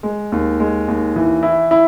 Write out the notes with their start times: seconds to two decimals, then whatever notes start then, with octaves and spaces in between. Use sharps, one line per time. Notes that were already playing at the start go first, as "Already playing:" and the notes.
0.03 G#3
0.32 D#2
0.60 G#3
0.88 D#2
1.16 E3
1.43 E4
1.71 E4